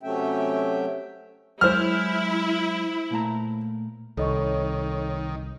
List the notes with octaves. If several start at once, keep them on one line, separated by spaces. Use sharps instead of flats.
C3 F#3 A3 C#4 E5 G5
F#3 G#3 E4 C5 F6
A#2 A3 A#5
C2 D#3 A4 C#5 D#5 C#6